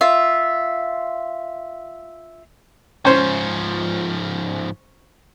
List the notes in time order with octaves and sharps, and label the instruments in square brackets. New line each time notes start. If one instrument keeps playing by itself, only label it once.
[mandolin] F4 E5
[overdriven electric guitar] G#2 F3 [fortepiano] C#4 C5